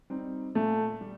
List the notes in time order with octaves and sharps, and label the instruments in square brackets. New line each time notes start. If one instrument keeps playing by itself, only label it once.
[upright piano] G3 C4 D#4
[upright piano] A#2 [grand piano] A3
[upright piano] G3